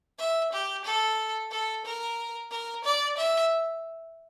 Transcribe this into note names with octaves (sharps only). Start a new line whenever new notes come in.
E5
G4
A4
A4
A#4
A#4
D5
E5